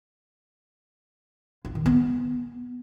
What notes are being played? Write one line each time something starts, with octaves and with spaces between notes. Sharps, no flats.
F4
D#3
B3